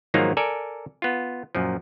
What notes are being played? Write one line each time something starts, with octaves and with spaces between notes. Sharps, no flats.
G#2 D#3 F3 F#3 A#3 D#4
A4 A#4 D5 G#5
B3 F4
F#2 A#2 F3